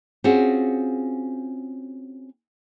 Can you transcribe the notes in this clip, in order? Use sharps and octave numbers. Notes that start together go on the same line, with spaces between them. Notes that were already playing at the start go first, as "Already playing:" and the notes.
C4 C#4 F4 F#4 G#4